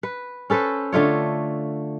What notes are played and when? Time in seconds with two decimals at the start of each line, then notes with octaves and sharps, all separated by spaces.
0.03 B4
0.50 C#4 A4 B4 C5
0.93 D3 A3 F4 C#5